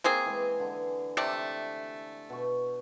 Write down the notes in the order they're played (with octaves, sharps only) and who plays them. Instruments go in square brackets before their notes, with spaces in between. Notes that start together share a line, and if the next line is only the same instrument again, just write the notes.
[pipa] A#3 C4 G#4
[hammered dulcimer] E3 G#3
D3 E3
[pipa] C3 A3 D5
[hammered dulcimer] B2 C#6